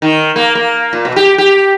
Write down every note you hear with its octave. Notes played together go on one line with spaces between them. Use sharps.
D#3
A#3
A#3
A#2
B2
G4
G4